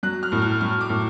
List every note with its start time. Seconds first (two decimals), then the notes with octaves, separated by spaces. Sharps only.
0.03 F#3 F#6
0.23 F6
0.32 A2
0.42 F6
0.61 F#3 F6
0.81 D6
0.89 A2